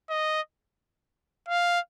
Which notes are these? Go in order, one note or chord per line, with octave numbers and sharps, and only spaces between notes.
D#5
F5